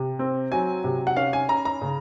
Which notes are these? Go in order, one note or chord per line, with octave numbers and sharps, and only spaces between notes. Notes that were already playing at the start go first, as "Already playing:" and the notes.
Already playing: C3
C4
F#3 G#5
C3
F#5
C#4 F5
G#5
C#4 A#5
A#5
C#3